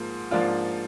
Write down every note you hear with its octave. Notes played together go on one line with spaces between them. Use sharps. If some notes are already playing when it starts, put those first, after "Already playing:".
Already playing: G#2 F3 A#3
G#2 F3 A#3 D4 F4